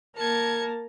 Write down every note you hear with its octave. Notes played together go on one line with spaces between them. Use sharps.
A#3 A#4 A5 G#6 C#7